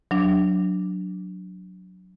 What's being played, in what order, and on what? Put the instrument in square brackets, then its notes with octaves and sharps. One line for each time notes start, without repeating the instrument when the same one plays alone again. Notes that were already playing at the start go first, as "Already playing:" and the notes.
[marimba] F#3 D4